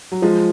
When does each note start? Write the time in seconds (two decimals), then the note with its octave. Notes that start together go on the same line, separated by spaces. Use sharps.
0.12 F#3
0.22 F3 G#3